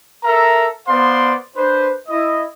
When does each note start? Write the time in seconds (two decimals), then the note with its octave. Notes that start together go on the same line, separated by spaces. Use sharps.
0.24 A4 A#4 E5 A#5
0.87 B3 C5 D5 F5 C6
1.57 D4 B4 C5
2.09 E4 D#5